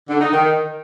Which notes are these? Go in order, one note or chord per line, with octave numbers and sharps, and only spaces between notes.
D3
D#4
D#3